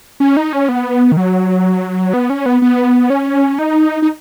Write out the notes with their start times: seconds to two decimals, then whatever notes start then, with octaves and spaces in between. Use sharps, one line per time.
0.20 C#4
0.37 D#4
0.53 C#4
0.69 B3
1.12 D#3
1.17 F#3
2.14 B3
2.30 C#4
2.46 B3
2.62 B3
3.10 C#4
3.59 D#4
4.02 D#4